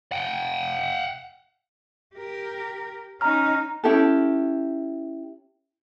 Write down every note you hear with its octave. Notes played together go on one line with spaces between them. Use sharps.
F#5 G5
G4 A#4
C#4 D#4 A#5 F6
C#4 E4 G4 A4